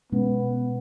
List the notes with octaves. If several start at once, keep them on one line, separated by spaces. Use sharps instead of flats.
B2 G#3 B3 C#4